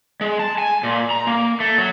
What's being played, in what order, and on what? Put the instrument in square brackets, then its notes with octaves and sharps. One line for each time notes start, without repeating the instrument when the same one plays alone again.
[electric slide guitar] G#3
A5
G#5
A#2
A#5
A#3
A3
F#3